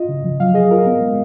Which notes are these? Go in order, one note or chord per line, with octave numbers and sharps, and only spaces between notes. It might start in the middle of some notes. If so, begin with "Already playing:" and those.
Already playing: F4 D#5
C#3
F3
F#3 F5
G#4 D#5
F4 A#4
B3
G#3